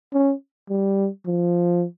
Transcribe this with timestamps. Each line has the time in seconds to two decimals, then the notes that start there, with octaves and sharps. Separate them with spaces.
0.13 C#4
0.69 G3
1.26 F3